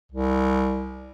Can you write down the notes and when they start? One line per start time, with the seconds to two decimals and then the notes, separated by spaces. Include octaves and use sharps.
0.12 C2